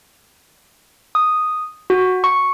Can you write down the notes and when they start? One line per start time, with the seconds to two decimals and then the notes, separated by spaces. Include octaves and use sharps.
1.15 D#6
1.90 F#4
2.24 C#6